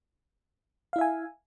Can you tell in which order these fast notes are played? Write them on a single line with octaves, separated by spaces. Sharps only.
F5 E4 E5 G#5